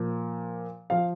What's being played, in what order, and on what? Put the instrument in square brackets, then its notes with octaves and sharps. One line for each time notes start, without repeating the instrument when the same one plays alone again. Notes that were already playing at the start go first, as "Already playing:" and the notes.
Already playing: [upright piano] A#2 F3
F3 F5